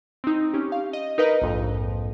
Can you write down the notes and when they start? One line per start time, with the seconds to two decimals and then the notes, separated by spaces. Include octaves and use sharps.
0.24 C4 D#4
0.54 C#4 G4
0.72 F5
0.93 D#5
1.18 D#4 A#4 B4 D#5
1.42 A#1 F2 G#2